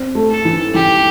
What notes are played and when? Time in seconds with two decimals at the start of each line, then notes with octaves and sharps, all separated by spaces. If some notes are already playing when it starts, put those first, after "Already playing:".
Already playing: C4
0.15 A3
0.30 A4
0.45 E3
0.74 E3 G4